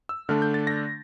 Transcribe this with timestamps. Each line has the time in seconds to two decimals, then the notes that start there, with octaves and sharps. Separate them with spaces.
0.09 E6
0.29 D3 A3 D4 F6
0.42 G6
0.54 A6
0.67 A#6